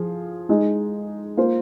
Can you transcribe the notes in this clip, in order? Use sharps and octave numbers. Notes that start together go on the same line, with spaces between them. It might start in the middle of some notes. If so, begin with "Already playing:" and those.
Already playing: F3 G#4
G#3 D#4 G#4 D#5
A#3 F4 C5